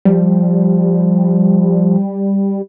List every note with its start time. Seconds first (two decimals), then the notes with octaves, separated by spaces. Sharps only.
0.05 F3 G3